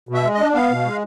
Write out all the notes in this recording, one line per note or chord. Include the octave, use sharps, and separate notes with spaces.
B2
E5
G#3
D#5
D4
B3 F5
B2
G#3